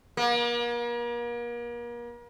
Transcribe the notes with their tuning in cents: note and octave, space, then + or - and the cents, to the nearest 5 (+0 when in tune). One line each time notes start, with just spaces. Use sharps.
A#3 +40